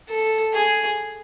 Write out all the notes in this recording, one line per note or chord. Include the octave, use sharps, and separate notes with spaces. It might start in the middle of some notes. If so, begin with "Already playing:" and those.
A4
G#4